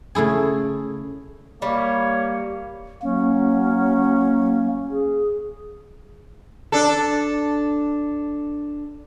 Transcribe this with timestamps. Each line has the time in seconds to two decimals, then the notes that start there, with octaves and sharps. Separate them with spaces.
0.15 C#3 A3 E4 G#4
1.62 G3 A#3 C#5
3.03 F#3 A#3 C#4
4.90 G#4
6.72 D4 A4